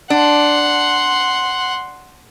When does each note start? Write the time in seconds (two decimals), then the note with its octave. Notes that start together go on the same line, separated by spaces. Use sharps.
0.10 D4 F#5 C6